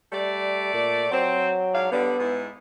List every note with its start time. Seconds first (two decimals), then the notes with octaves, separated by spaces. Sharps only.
0.12 G3 A3 D5
0.74 A#2
1.11 F#3 C4
1.73 G#2 D4 F5
1.92 D3 G3 B3
2.19 G#2 G#3 E4